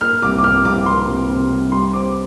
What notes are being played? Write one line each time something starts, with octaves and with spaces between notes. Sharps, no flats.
A#3 F6
C2 D6
D6
C3 F6
C2 D6
A#3 C6
C2
C3
C2
G3 C6
C4 D6